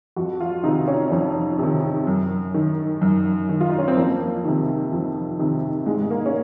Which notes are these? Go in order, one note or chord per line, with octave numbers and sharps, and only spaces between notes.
F2 F#4
F4
C3 D#3 D#4
C#4
F2 C#4
C3 D#3
F#2
D#3
F#2
D#3
F4
D#4
C#4
C4
F2 A#3
C3 D#3
F2
C3 D#3
G#2 G#3
G#3
A#3
C#4